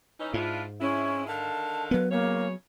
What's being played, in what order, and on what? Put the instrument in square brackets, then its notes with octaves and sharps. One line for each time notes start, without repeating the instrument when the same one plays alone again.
[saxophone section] E3 C#4 D#4
[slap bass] G#2 [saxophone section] D4 E4 F4
[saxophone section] G#3 C4 E4 [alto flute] C#4
[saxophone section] D3 D#3 F5 [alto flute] A5
[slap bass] F#3 B3 [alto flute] B4
[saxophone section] C#3 C#5 [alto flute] A#3